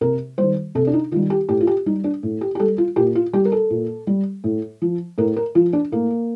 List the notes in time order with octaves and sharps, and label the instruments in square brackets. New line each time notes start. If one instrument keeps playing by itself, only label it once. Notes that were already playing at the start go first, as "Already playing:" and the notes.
[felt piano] C3 A#4
D#3 G3 C5
C3 A4
D4
D#4
D#3 F4
G3
G4
A2 G4
F4
G4
G3 D#4
D4
A2
G4
G4
G3 A4
F4
A#2 G4
F4
G3 G4
A#4
A4
A#2
G3
A2
F3
A2 A#4
A#4
F3 F4
D4
A2 A#3